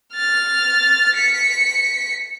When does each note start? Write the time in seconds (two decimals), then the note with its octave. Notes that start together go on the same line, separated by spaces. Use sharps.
0.14 F6 A6
1.15 B6 C#7